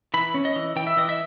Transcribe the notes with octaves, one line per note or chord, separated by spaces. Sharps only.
E3 B5
C#4
D#5
E3
E3 G5
E5
E3 D#5
E5